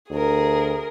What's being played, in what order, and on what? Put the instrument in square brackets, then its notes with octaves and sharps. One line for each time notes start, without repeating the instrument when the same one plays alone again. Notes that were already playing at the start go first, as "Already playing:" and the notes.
[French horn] D2 [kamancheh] G#4 A#4